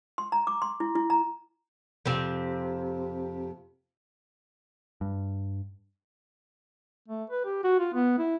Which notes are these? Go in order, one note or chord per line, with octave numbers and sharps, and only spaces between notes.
C6
A#5
D6
C6
E4
E4
A#5
F2 C3 C4
G2
A3
B4
G4
F#4
F4
B3
E4